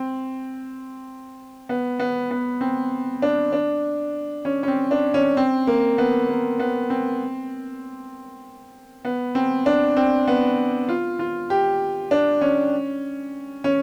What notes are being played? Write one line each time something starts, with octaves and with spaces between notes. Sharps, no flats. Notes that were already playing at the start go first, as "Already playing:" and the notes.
Already playing: C4
B3
B3
B3
C4
D4
D4
C#4
C#4
C4
D4
C#4
C4
A#3
B3
A#3
B3
C4
B3
C4
D4
C4
B3
F4
F4
G4
D4
C#4
C#4